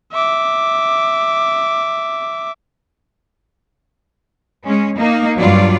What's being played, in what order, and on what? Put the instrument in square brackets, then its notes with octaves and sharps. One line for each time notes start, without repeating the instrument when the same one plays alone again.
[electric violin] E5 D6
[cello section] G#3 C#4
A#3 D#4
G2 F#3 G3 F4 D5